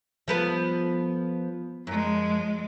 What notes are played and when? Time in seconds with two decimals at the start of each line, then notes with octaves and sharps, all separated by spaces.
0.28 F3 B3 A4
1.87 F#2 F3 G#3